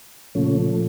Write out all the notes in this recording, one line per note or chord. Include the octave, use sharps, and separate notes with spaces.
A#2 C#3 F3 A3 C#4